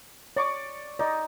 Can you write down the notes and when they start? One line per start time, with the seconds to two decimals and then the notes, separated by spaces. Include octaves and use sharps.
0.36 C#5 D5 C#6 D6
0.99 D#4 D5 D#5